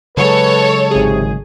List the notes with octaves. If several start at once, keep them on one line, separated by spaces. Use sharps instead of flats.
C#3 F#3 G#3 A4 B4 C#5
G#1 C3 G#4